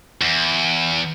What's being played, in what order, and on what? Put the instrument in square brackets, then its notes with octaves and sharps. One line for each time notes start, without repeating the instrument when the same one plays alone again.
[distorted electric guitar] E2